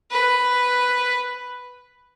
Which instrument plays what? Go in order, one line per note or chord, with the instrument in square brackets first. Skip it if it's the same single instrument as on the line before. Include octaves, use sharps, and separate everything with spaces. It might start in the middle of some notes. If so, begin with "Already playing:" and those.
[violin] B4